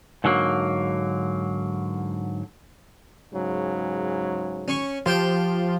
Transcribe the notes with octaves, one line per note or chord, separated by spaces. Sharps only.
G#2 D3 F#3 A#3
G#2 C#3 F#3
C#4 C#6
F3 G4 C5 G5